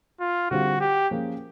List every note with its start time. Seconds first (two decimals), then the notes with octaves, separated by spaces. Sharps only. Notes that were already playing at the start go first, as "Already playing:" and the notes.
0.20 F4
0.50 D3 G3 C4 F4 F#4 G#4
0.80 G4
1.11 F3 A#3 C#4 F4 G#4